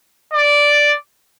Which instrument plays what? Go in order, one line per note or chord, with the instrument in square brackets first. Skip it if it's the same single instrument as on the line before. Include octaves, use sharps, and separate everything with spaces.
[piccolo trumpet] D5